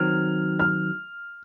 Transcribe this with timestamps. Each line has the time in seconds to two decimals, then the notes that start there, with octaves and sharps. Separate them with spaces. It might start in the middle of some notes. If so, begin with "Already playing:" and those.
Already playing: D#3 F#3 C4 F6
0.59 F6